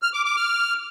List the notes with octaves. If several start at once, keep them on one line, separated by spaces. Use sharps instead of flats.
F6
D6
D6
F6